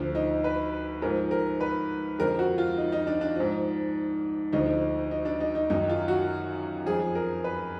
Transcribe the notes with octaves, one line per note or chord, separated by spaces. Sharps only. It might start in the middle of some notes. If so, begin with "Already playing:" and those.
Already playing: D2 D3 F3
D#4
B4
G#2 F3 A#4
A#4
B4
F2 D3 F3 A#4
F#4
F4
D#4
D#4
D4
D4
G#2 F3
D2 D3 F3 D#4
D#4
D4
D#4
D#4
F#2 D#3 D#4
F4
F#4
F2 F3 G#4
A#4
B4